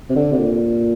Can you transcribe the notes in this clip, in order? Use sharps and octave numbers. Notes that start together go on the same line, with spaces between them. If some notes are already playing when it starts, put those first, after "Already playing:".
C3
D3
C3
A#2